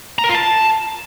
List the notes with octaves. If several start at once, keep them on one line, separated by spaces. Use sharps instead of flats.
A#5
A#4
F4
A5